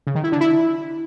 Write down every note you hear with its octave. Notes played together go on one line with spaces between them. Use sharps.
C#3
D#3
E4
D3
E4